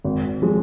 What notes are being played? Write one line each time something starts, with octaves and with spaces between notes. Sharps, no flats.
G#1
F3 G#3